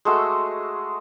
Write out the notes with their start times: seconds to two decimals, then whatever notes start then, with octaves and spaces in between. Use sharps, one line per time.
0.05 G#3 A3 F#4 E6